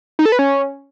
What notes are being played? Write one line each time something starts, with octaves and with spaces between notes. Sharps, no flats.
D#4
A4
B4
C#4